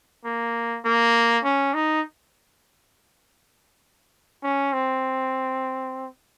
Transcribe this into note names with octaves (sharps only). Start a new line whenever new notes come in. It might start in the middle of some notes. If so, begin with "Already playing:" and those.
A#3
A#3
C#4
D#4
C#4
C4